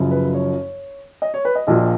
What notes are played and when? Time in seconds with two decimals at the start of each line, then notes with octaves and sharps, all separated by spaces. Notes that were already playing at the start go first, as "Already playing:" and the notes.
Already playing: F#1 F#2 C#3 F3
0.11 B4
0.34 C#5
1.22 D#5
1.34 C#5
1.45 B4
1.55 D#5
1.67 A#1 A#2 F3 D#5